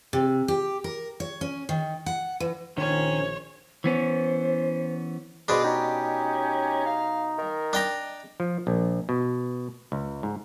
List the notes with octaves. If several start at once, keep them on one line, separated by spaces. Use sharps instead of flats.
C3
G4
A#4
C#5
C#4
D#3
F#5
E3
A#1 D#3 C#4 C5 C#5 G#5
E3 B3 C#4 C5
B2 D4 G#4 C5 D6
C#4 D#4 G4
F5
D#3 A#4
D4 D#5 G5 A#5
F3
A#1
B2
C#2
G#2